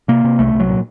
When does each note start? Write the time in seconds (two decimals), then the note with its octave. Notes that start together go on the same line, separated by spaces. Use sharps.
0.08 C3 A#3
0.24 C3
0.39 C2 A3
0.54 C2
0.60 F#3
0.69 A#2